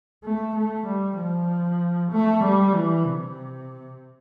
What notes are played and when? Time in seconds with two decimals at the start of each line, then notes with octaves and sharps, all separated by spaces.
0.23 A3
0.55 A3
0.86 G3
1.18 F3
2.11 A3
2.43 G3
2.75 E3
3.05 C3